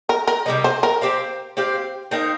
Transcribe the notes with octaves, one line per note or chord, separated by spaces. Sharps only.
A#4
A#4
C3 G3 A#3 D#4
C5
A#4
C4 G4 C5 F5
C4 G4 C5 F5
C4 D#4 A#4 F5